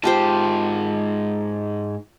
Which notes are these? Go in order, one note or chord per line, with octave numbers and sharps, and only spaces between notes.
G#2 F4 G4 C5 A5